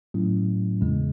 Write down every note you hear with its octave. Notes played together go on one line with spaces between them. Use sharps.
A2 F#3 A3 C#4 E4
E2 C#3 G#3